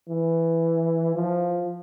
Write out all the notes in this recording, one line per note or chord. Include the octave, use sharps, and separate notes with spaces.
E3
F3